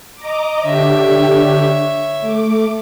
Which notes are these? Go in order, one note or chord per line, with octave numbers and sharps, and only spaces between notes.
D#5 A#5 D6
D3 D4 G4 C#5 E5
A3 D6